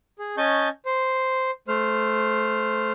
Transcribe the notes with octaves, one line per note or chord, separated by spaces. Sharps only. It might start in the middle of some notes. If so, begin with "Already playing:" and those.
G#4
C#4 D#5 A5 C#6 G6
C5
A3 C5 F6